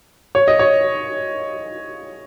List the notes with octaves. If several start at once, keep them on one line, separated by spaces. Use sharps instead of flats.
C#5
D#5
C#5